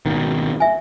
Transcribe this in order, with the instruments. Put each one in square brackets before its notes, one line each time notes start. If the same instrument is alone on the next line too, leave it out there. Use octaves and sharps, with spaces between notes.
[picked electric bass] G#1 B2 D#3
[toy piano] E5 G#5